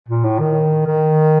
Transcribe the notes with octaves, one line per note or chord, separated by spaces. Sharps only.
A#2
A2
D#3
D#3